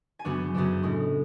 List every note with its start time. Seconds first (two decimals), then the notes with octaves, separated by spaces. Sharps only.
0.19 G#5
0.25 F#2 C#3 F#3 B3 D4 F#5
0.54 F#2 C#3 F#3 B3 D4
0.83 A2 G#3 C#4